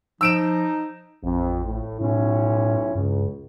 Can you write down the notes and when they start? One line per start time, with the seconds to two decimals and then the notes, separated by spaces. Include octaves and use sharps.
0.21 F3 D#4 E6 D7 E7
1.23 A1 F2
1.65 A2
2.00 B1 A2 C#4 E4
2.95 C#2 G2